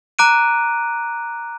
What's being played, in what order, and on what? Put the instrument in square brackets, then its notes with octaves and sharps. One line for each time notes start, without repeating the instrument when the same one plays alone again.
[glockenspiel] A#5 D6 F#6 D7 D#7